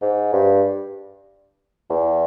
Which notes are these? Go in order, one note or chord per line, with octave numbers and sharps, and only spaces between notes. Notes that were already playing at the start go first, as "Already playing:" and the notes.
G#2
G2
E2